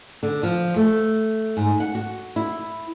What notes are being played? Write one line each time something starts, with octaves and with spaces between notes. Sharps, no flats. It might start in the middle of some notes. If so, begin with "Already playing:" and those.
D3
F3
A3
G#2
F#5
F#4
E4